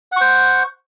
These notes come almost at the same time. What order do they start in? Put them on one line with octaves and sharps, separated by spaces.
F#5 C#6 C5